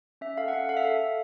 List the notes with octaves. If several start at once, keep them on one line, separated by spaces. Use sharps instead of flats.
C#4 E5
A4 F5
F#5
C#4 F5
A4 F5
E5
A4 F5
A4